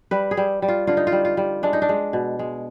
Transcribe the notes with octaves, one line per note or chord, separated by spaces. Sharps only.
G3 B4
G#4
G3
G3
F4
D3 F4
D#4
F4
G3
F4
G3
G#3 D4
D#4
D4
G#3
B2
G#3